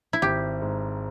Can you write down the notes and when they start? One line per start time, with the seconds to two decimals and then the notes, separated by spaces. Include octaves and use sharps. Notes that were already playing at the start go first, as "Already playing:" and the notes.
0.13 E4
0.22 G#1 G4
0.62 G#2